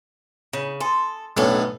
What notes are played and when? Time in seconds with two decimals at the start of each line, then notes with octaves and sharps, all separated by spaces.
0.53 C#3 D#4 E4
0.80 A4 G#5 C6 D#6
1.37 B1 A2 D#3 B3 C#4 D4